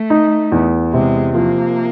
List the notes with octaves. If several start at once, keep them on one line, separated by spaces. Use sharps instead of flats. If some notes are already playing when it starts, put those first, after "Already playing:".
Already playing: A3
D#4
E2
C3 G#3
F3 A#3